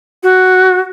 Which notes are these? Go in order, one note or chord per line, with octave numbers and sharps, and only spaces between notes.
F#4